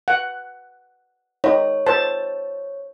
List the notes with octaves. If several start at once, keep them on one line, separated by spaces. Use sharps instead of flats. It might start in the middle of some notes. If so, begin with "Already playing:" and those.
F#5
D#4 C#5
C5 A5